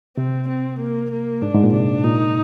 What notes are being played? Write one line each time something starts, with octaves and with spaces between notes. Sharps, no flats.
C3 C4
C4
A#3
A#3
G#2 D4
G#2
A#2
C3 D4
A#2 D#4